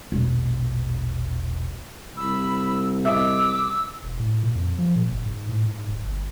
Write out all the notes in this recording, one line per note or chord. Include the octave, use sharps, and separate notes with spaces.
E1 A#1
C2 B5 E6
D#5 E5 D6 E6
E1
A2
A#2
F2
F3
A#2
F#1
G#2
A2
G#2
D1
G1